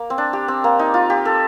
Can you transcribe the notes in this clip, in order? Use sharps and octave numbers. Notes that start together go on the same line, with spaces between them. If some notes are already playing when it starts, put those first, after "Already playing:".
Already playing: A#3
C4
D4
G4
C4
A#3
D#4
F4
G4
A4